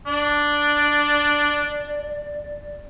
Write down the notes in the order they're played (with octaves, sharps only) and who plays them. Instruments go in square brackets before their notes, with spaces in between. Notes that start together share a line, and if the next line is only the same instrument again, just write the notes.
[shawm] D4 [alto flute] D5